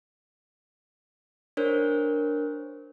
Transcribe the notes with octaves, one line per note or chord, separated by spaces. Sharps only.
D4 A#4 C5 C#5